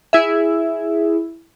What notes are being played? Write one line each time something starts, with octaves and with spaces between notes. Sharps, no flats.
E4 G#4 E5